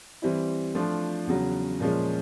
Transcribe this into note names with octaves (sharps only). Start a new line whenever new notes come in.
E3 G3 C4 E4
F3 A3 D4 F4
E2 C#3 F#3
A#2 F3 G#3 C#4